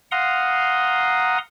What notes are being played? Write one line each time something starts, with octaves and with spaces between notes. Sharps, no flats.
F5 F#5 A#5 C6 D#6